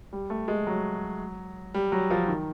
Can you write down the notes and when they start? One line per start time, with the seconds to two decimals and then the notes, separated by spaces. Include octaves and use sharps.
0.13 G3
0.30 A3
0.48 G#3
0.67 F#3
1.74 G3
1.92 F#3
2.10 F3
2.28 D#3